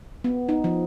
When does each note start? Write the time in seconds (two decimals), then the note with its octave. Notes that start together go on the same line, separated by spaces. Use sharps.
0.24 B3
0.49 D#4
0.64 F3